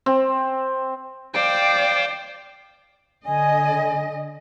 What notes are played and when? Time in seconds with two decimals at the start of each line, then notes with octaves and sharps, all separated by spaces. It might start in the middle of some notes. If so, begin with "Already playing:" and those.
0.06 C4
1.34 C5 D5 F5 G5
3.26 D3 D#5 G#5